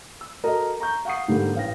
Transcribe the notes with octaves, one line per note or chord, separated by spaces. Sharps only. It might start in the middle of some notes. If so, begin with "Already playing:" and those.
E6
F#4 A4 A#4 D#5 A#5
A#5 C#6 G6
F5 F#5 C#6 D#6 C7
G#2 D3 G3 A#3
A1 F5 G5 A#6